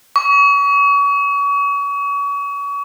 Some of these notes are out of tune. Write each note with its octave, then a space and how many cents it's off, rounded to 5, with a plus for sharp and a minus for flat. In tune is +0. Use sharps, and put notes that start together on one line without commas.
C#6 +35